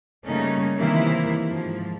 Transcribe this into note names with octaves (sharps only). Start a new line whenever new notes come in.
C#3 G3 A3 A#3 C#4 D#4
C3 D#3 E3 A#3 E4
G#2 F3